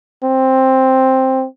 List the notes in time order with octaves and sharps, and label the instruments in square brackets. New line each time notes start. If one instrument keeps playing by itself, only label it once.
[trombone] C4